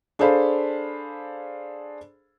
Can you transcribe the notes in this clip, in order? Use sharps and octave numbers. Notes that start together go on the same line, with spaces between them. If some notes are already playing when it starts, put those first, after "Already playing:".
D4 G#4 A4 C5 F5 B5